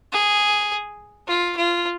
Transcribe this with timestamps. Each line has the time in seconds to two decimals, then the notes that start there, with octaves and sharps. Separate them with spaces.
0.13 G#4
1.28 F4
1.57 F4